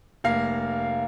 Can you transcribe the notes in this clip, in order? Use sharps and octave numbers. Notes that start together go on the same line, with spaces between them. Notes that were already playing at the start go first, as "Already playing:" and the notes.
F1 A#3 F5 C7